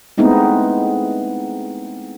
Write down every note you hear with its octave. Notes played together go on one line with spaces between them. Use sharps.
G#3 A3 B3 C4 D#4 E4